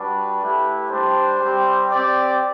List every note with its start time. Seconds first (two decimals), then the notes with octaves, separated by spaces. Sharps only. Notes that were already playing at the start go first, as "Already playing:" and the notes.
Already playing: G3 D4 F#4 B4
0.40 A3 E4 G4
0.91 G3 D4 G4 C5
1.42 G3 C4 G4
1.92 C4 G4 D5